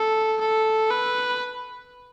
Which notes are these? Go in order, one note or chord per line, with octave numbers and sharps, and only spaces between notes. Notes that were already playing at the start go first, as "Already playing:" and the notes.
Already playing: A4
A4
B4